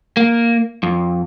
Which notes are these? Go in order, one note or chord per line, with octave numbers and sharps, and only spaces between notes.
A#3
F2